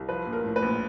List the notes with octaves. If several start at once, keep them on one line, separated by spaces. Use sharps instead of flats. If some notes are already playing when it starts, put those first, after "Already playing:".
Already playing: C2
F3 B4
A#1
A#4
A2
B4
A#1